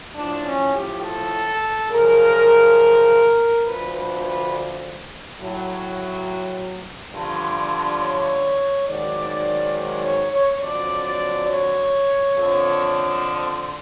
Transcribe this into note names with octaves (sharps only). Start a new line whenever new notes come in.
A2 F3 D4
C#4
G4
A4
F#2 C#3 F3 A#4
D2 D3 F3 B4
B4
B4
A2 F#3
G2 D3 F3
C#5
G#2 D#3 F#3 D5
D5
C#5
C#5
F2 D3 F#3 D5
C#5
F2 D3 F3
C5